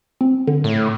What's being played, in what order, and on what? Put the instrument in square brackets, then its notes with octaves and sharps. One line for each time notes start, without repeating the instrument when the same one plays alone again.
[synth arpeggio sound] C4
D3
[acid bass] A2